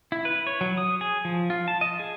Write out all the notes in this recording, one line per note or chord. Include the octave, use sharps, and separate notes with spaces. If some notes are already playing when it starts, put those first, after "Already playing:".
E4
B4
C#5
F#3
D#6
G#4
F3
F4
A5
D#5
G#4